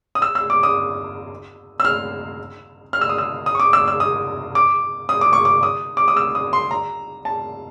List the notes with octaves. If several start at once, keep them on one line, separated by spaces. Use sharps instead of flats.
D#6
E6
E6
D6
D#6
E6
F6
F6
E6
D#6
E6
D#6
C#6
D6
E6
E6
D#6
D6
D#6
D6
C#6
D6
D#6
D6
D#6
E6
D#6
C6
A#5
A5